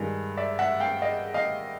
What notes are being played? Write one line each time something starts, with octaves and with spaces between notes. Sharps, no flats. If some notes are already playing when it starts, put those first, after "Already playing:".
Already playing: G2 D#3 G#3
D5 E5
E5 F#5
F5 G5
D#5 F5
D#5 F5